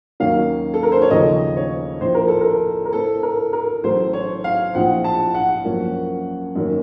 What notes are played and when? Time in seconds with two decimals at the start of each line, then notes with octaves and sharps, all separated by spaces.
0.20 D#2 D#3 F#3 A#3 C#4 F5
0.74 A4
0.83 A#4
0.92 C5
1.02 C#5
1.11 D#2 C#3 F3 A3 D#5
1.57 C#5
2.01 A#1 A2 F3 C5
2.15 A#4
2.28 A4
2.41 A#4
2.85 A#4
2.92 A2 A3 C4 A4
3.23 A#4
3.53 A#4
3.83 A1 A2 F#3 A3 C5
4.13 C#5
4.44 F5
4.74 A#1 A2 F3 C4 F#5
5.04 A5
5.34 F#5
5.65 F#2 F3 A#3 C#4
6.55 F#2 D#3 A#3 C#4